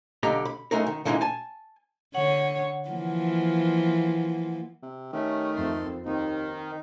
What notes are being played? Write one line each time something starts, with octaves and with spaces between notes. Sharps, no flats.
B1 D3 G4 D#5 F5 A#5
B5
B1 G#2 G#3 A3 D#4 A#4
D#3
A#2 D3 E3 G#3 D4 D#4
G#5 A5
D3 C#5 F#5
E3 F3 A#3
C3
D#3 A3 C#4 G4
F2 C4 A4 C6
D#2 D#3 C4 D#4